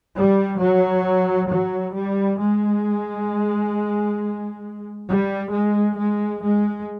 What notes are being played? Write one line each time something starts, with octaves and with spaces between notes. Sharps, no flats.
G3
F#3
F#3
G3
G#3
G3
G#3
G#3
G#3